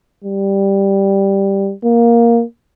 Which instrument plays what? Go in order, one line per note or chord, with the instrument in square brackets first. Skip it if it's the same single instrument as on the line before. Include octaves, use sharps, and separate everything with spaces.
[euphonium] G3
A#3